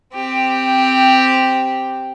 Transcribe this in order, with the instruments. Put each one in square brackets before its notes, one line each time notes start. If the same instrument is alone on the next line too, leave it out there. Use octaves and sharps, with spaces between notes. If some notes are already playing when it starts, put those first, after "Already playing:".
[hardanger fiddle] C4 G4